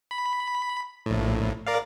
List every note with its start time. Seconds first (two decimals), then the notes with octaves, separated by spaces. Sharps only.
0.11 B5
1.06 A#1 A2
1.67 A#4 D5 F5